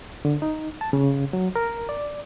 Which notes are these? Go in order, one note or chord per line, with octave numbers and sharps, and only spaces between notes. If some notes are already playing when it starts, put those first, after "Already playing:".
D3
D#4
A5
C#3
F#3
A#4
D5